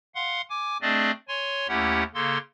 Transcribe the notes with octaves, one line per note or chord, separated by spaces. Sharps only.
F5 F#5 C6
G#5 D6
A3 C4 D4 G#4 D5 D#5
C#5 G#5 C6
D#2 A3 C#4 E4 G4 F#5
C#3 A#3 A4 C6